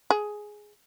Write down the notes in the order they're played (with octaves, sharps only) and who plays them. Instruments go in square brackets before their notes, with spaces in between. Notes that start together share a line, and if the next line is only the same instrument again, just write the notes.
[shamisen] G#4